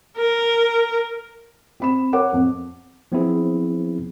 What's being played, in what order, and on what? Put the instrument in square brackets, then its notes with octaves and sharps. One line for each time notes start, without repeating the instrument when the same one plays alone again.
[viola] A#4
[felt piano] C4 B5 E7
A#4 C#5 F#5 D6
F2
[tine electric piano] F3 B3 C4 E4 G#4